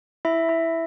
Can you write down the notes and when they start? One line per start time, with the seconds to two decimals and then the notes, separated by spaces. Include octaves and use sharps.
0.25 E4 E5
0.49 E4